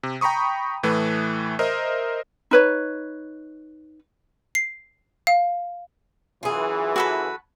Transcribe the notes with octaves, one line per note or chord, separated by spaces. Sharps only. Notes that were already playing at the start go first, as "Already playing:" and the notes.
C3
G5 A#5 B5 C#6 D#6
A2 E3 A3 B4
A#4 C5 D#5 E5
D#4 B4 C#5
C7
F5
F#2 E3 F4 G#4
F#4 A4 B4